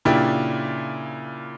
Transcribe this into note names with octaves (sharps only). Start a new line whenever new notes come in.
A#2 C#3 D4 E4 G4